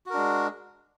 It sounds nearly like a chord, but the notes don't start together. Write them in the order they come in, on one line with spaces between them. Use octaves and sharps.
F#4 A#4 D4 G#3